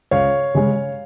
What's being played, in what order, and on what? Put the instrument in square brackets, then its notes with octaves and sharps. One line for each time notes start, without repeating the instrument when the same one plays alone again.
[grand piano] C#2 C#5 F5
C#3 G#3 C#4